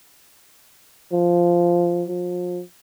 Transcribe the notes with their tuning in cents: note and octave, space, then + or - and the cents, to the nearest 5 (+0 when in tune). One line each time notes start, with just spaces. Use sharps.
F3 -5
F3 +30